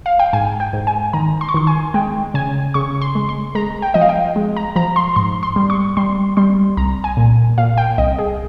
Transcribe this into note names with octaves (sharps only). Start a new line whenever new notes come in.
F5
G5
G#2 G#5
G5
G#2
G#5
D#3 A#5
C6
C#6
D#3 C6
G#5
G#3 G5
C#3 G#5
C#3 C#6
C6
G#3
C6
G#3 A#5
G5
F3 D#5
F5
G5
G#3
A#5
F3 A#5
C6
G#2 C6
C6
G3
C#6
G3 C6
G3 C6
C2 A#5
G#5
A#2
A#2 F5
G5
C2 D#5
G#4